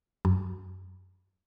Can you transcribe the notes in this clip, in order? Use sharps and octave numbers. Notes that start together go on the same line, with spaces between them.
F#2